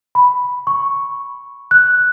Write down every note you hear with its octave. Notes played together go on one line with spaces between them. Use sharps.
B5
C#6
F#6